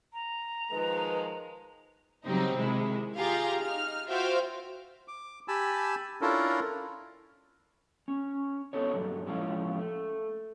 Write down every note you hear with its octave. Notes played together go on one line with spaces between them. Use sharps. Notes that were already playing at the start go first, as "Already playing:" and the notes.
A#5
D#3 F3 G#3 B4
C#3 F#3 G3 C4 D#4
C3 D#3 G#3 E4
F4 G4 G#4 F5 A#5 C6
D#4 F6
F4 F#4 C5 E5 F5 G5
D6
G4 G#5 A5 B5 E6
C#4 D4 E4 F4 A4 A#4
C#4
B3 C4 D#4 A4 C#5
G2 A#2 D3 F#3
A2 F3 G#3 C#4 E4 F4
A3